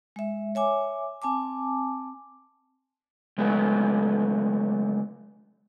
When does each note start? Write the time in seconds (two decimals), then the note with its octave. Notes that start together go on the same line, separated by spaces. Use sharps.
0.16 G#3 E5
0.55 C#5 E5 G#5 D6
1.22 C4 G#5 A5 D6
3.38 C#3 F#3 G#3 A3 B3